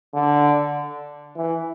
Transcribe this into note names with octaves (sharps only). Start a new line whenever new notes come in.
D3
E3